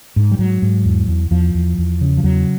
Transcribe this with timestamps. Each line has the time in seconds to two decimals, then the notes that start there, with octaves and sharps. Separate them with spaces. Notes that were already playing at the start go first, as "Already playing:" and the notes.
0.16 G#2
0.32 G3
0.39 G#2 F#3
0.62 G#2
0.85 E2
1.08 E2
1.31 E2 F3
1.55 E2
1.78 E2
2.01 C#3
2.17 F3
2.24 E2 F#3